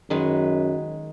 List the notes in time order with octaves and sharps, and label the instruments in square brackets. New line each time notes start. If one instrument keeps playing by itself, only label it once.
[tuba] F#2 [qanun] D#3 G#3 B4